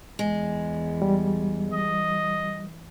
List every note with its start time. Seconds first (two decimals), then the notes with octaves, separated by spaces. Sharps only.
0.19 E2 G#3
1.02 G3
1.73 E3 D#5